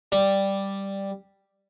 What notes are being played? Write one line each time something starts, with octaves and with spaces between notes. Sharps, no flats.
G3